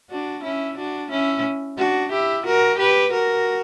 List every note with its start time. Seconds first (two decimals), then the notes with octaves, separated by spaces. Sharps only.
0.10 D4 F#4
0.44 C#4 E4
0.77 D4 F#4
1.11 C#4 E4
1.78 D4 F#4
2.12 E4 G4
2.46 F#4 A#4
2.78 G4 B4
3.12 F#4 A#4